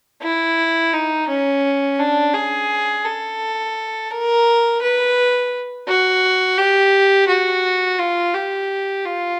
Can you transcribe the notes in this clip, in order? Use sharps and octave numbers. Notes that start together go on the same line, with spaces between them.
E4
D#4
C#4
D4
G#4
A4
A#4
B4
F#4
G4
F#4
F4
G4
F4